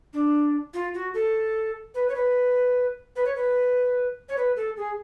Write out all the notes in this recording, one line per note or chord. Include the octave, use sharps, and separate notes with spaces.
D4
F4
F#4
A4
B4
C#5
B4
B4
C#5
B4
C#5
B4
A4
G#4